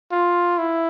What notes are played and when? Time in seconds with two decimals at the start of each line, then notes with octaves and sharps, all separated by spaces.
0.12 F4
0.58 E4